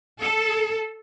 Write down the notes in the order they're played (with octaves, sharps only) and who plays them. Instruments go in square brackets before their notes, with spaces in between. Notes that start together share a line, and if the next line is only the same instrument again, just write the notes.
[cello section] A4